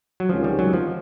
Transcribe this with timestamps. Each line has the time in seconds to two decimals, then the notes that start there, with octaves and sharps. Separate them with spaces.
0.20 F#3
0.29 C#2 C3 D#3 F3 G#3 C#4
0.44 G3
0.59 F#3
0.73 F3